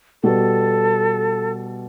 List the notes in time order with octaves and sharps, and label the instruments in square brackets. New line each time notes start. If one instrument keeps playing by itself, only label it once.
[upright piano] B2 G3 B3 [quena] A4